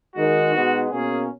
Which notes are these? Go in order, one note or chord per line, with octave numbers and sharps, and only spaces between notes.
D#3 G#3 D#4 F#4
B2 G#3 B3 D#4
B2 A#3 C#4 G#4